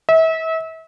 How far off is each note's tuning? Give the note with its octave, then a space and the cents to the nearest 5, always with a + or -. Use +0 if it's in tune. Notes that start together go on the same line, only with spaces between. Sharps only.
E5 -35